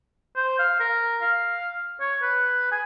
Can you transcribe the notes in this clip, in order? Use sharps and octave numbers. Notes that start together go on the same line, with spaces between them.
C5
F5
A#4
F5
C#5
B4
G#5